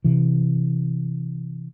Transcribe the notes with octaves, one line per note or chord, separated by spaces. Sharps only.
C3 E3